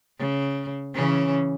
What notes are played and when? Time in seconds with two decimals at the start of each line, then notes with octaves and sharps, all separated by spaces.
0.18 C#3
0.94 C#3 E3 C#4